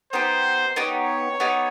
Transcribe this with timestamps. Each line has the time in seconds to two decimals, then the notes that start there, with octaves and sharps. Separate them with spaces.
0.13 B3 D#4 G4 C5
0.76 B3 D#4 G4 C#5
1.40 B3 D#4 G4